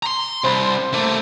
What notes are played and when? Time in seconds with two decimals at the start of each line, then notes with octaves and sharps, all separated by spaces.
0.03 A#5 C6
0.44 C2 C5 B5
0.94 A3 A#3